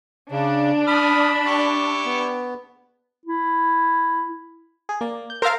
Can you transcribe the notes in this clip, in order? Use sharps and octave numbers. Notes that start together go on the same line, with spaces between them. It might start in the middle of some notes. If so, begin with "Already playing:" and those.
C#3 D4
E3 B5 D#6 F6
E4 G4 C#6
B3
E4
G#4
A#3 D5
G6
A#4 C5 E5 F5 A5